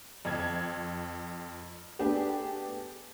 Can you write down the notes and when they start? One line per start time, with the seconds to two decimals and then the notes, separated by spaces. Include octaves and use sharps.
0.25 F2 G#6
1.99 A3 B3 D4 G4 G#4